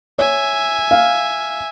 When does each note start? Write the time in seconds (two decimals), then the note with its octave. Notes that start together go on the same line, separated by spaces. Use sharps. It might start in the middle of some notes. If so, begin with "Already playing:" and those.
0.19 C#5 E5 G#5
0.91 F5